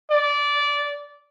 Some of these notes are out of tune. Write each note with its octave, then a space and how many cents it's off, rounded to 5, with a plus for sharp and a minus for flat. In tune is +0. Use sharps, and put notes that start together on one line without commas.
D5 -20